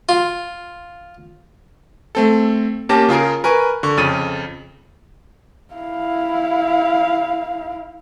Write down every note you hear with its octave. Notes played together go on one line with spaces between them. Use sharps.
F4
A3 C4 A4
A#3 C#4 G4 A5 A#6
C#3 F4 G#4 A#4
A#4 B4 G#5 C#6
D3 C#6
F2 C#3 A6 D#7
E4 F5